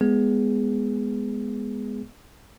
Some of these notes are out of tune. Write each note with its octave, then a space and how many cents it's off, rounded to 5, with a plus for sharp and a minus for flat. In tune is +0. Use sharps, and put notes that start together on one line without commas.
G#3 +0 B3 +0 G#4 +0